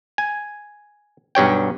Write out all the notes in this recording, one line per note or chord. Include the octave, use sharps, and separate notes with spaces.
G#5
B1 G2 C#5 G5